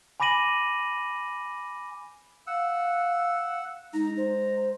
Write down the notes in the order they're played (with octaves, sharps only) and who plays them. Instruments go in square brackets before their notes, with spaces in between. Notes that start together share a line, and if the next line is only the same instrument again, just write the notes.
[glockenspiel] G#5 B5 D6 A#6 D#7 F#7
[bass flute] F5 [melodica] F#5 E6
[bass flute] G#3 [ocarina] D#4 [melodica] A#5
[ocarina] C5